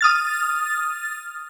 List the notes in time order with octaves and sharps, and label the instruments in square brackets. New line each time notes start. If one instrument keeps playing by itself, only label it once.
[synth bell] D#6 F6 A6